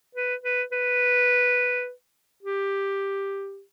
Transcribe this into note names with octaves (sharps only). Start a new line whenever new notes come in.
B4
B4
B4
G4